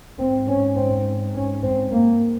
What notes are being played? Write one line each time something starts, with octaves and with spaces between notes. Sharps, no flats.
G#2 C4
C#4
C4
C#4
C4
A#3